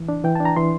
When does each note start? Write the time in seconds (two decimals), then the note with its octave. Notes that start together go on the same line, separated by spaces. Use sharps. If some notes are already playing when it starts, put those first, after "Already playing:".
Already playing: E3
0.09 D4
0.24 E3 G5
0.35 D4 A5
0.45 A#5
0.56 E3 C6